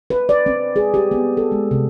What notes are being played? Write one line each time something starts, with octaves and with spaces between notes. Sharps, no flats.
B4
D5
C4
G#4
G4
B3
A4
G#3
C3